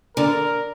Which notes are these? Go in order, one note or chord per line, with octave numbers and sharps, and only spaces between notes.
D3 A#4